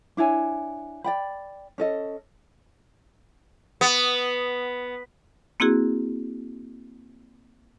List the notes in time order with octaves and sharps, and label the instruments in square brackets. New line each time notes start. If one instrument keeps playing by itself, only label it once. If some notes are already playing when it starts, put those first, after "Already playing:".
[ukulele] D4 E4 C#5 G#5
D5 G5 B5
C#4 A4 D#5
[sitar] B3
[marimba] A#3 C4 E4 F#4 G#4